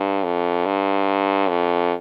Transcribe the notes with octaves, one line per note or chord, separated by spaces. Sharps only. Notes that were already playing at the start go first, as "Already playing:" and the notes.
Already playing: G2
F2
G2
F2